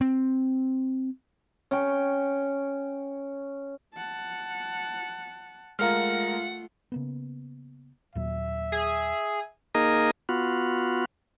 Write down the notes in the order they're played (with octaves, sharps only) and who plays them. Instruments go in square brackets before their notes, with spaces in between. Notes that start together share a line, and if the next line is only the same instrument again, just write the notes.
[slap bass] C4
[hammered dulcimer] C#4 G5 C#6
[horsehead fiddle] F#5 A5
[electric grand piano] G#3 A#4 A#5 [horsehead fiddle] A3 F4 [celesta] F5 F6 [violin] F#5
[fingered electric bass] C#3 A#3 B3
[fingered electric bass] D#2 A#2 F#3 [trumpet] E5
[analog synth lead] G#4
[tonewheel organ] A#3 D#4 G#4 A#4 D#5
B3 F4 F#4